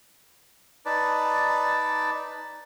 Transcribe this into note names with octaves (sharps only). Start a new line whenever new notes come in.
D#4 B4 D5 A5